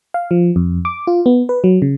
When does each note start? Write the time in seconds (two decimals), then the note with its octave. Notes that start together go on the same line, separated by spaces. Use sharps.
0.14 F5
0.31 F3
0.56 F2
0.85 D6
1.07 F4
1.26 B3
1.49 B4
1.64 F#3
1.82 C#3